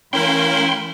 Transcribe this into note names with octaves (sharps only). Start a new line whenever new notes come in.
E3 A3 C#4 E4 A#4 F5 G5 C6